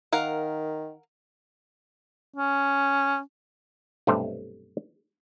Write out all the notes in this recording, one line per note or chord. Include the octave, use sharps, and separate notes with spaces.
D#3 A#4 F5 F#5
C#4
B1 G2 C3 A3 C5